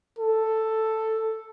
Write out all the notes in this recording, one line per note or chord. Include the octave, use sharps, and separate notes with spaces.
A4